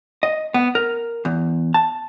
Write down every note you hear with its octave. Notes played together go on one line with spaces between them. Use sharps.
D#5
B3
A#4
E2
A5